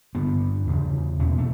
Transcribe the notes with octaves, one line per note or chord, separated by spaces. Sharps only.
G2 D3 B3
E2 C#3
E2 B2 C#4
A3